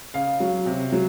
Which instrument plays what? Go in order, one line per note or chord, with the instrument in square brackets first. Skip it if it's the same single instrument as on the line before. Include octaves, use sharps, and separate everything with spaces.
[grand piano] C#3 F5
F#3
C3
F#3